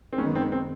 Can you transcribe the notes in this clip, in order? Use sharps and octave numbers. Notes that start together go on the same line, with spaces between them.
C4
F#2 D#3 G#3 B3 C#4
C4
C4